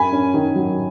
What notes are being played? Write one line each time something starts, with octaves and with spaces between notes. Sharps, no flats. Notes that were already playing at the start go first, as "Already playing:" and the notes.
Already playing: F#2 G#5 B5
C#4
D#3
F#3